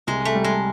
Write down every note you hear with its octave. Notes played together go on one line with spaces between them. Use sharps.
C2 G#3
A3
G3
G#3